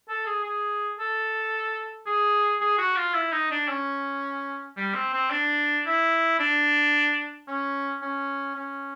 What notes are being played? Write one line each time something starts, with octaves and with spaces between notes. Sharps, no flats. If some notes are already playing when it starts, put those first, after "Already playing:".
A4
G#4
G#4
A4
G#4
G#4
F#4
F4
E4
D#4
D4
C#4
G3
C4
C4
D4
E4
D4
C#4
C#4
C#4